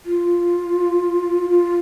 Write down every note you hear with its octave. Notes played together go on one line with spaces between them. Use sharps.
F4
F4